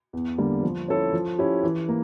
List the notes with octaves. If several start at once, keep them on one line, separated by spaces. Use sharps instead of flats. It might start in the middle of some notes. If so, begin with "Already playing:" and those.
E2
D3 G3 A#3
F3
C#4 E4 A4 C#5
F3
C#4 E4 G4
E3
A#3